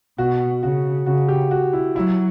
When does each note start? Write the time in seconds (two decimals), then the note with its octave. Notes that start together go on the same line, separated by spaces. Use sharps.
0.18 B2 F#4
0.63 C#3 F#4
1.06 C#3 F#4
1.28 G4
1.51 F#4
1.73 E4
1.95 F#3 E4